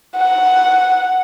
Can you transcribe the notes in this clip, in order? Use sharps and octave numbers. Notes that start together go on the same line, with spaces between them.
F#5